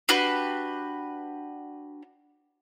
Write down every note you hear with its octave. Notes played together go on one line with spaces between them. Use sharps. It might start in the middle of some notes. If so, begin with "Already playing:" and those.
D4 F#4 G4 B4